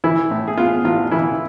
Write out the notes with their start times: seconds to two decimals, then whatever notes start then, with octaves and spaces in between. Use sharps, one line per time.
0.04 E3 E4
0.31 A2
0.48 G#4
0.57 B3 F4
0.84 A1 F4
1.11 E3 E4